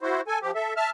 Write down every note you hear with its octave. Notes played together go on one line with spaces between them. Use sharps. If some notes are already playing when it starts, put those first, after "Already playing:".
E4 F#4 C5
A4 G#5
F3 G4
A4 E5
E5 A5 F6